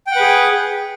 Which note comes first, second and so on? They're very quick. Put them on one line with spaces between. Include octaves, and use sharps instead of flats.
G5 F#5 B4 G#4